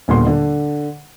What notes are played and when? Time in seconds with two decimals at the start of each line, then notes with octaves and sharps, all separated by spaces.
0.08 D#1 A#2 D3 B3 C6
0.26 D3